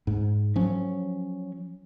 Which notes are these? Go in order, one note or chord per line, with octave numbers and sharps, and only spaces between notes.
G#2
F3 F#3 C#4